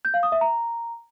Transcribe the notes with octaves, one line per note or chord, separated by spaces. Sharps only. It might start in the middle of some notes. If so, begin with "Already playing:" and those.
G6
F5
D#6
E5
A#5